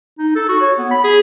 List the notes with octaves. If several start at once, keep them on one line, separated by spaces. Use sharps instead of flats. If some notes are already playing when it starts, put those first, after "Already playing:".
D#4
A4
F#4
C#5
B3
B5
G#4